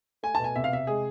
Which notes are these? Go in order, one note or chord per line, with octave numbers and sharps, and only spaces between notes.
A3 G#5
B2 A5
G#5
C3 E5
F5
C3 E5
G#3 G#4